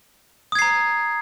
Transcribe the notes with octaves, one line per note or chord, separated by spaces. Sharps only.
A#5 D#6 G#6 C7